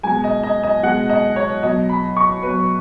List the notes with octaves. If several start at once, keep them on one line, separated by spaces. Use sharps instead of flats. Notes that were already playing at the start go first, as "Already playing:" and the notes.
B2 G#3 G#5
D#5
D#5
D#5
B2 G#3 F#5
D#5
C#5
B2 F#3 D#5
B5
C#6
B2 F#3 B4